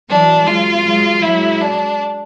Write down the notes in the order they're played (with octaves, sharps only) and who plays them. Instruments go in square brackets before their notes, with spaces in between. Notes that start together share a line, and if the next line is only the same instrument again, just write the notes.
[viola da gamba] E3 F#3 [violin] D4
[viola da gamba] F#3 G#3 [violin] F4
[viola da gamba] F#3 G#3
[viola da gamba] F#3 G#3 [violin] E4
[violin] D4